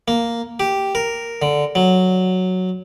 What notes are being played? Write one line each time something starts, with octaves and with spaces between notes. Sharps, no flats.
A#3
G4
A#4
D3
F#3